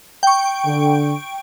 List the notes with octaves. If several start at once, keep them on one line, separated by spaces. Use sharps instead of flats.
G5 C#6
D3